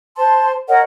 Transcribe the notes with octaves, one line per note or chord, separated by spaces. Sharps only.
C5 A5 C6
A#4 C#5 D#5 F#5